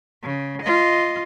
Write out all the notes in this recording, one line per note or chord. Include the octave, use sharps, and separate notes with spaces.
C#3
F4 D#5